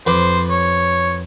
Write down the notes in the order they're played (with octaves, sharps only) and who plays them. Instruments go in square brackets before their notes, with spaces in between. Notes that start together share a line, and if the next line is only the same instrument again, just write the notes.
[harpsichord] F2 B4 D6 [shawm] C5
[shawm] C#5